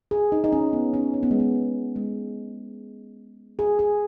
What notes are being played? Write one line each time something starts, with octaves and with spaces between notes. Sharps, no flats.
G#4
D#4
D#4
C#4
B3
C#4
C#4
B3
G#3
B3
G#3
G#3
G#4
G#4